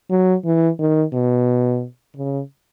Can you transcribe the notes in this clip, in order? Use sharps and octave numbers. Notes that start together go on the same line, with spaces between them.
F#3
E3
D#3
B2
C#3